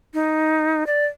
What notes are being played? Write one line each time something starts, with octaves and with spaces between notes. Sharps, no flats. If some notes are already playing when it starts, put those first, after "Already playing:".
D#4
D5